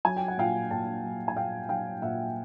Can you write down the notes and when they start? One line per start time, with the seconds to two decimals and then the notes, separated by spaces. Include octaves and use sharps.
0.05 F#3 G#5
0.16 G5
0.28 F#5
0.38 A#2 F5 G5
0.71 A#2 G5 A5
1.03 F#3
1.28 G#5
1.36 A#2 F5 G5
1.69 F#3 F5 G5
2.02 A#2 E5 F#5